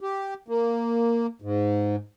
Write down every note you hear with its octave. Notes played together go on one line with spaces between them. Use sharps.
G4
A#3
G#2